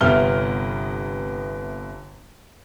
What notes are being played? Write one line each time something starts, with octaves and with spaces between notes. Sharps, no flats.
G1 C3 B3 E5 F6 G7